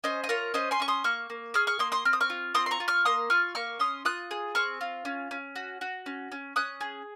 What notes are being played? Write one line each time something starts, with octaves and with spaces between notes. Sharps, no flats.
C#4 C5 D#5
D#5
F4 A#4 C#5
C#4 C5 D#5
G#5 C6
C#4 C#6
C6 D#6
A#3 C#6 F6
A#3
G#4 C#6 F6
C#6 F6
A#3 C6 D#6
C6 D#6
C4 F6
D#6
C#6 F6
F4
C4 C6 D#6
C6
A#5 C#6
F4
C#6 F6
A#3 C6 D#6
F4 C#6 F6
A#3 C#6 F6
C#4 C6 D#6
F4 D#6 F#6
G#4
C4 C#6 F6
F4
C#4
C#4
F#4
F#4
C#4
C#4
C#4 D#6 F#6
G#4